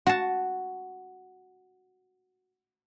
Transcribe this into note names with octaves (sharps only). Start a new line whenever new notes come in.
F#4 A5